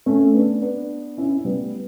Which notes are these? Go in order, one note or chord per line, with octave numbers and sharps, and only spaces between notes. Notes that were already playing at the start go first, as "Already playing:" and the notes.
A3 C#4
B3 D4
B3 D4
C#4 E4
C#4
G3 B3